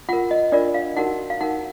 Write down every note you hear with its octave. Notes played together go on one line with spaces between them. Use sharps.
F4 A#4 F#5
D#5
D4 F4 A#4 D5
F5
D#4 F#4 A#4 F#5
F5
D#4 A#4 F#5